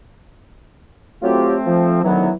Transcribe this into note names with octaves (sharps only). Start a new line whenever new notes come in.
F#3 A3 C4 F4 G4
F3
D2 D#3 E3 F#3 B3